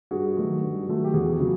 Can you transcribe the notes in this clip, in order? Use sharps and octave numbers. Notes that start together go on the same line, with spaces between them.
G2 F#4 G#4
D#3 F#3 A3
G2
D#3 F#3 A3
G4
E2 F#4 G#4
C#3 F#3